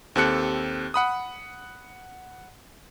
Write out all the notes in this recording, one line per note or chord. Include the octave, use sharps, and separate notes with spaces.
D#2 C4 G4 A4 F#6 C#7
F#5 B5 D#6